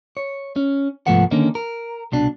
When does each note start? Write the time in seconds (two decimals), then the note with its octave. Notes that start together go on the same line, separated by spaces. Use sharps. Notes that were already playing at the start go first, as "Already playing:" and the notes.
0.17 C#5
0.56 C#4
1.07 C2 G#2 F3 A3 B3 F#5
1.31 D3 D#3 A#3 C#4 D#4
1.55 A#4
2.12 C2 B2 D4